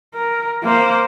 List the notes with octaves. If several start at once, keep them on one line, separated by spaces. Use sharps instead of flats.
A#4
A#3 C5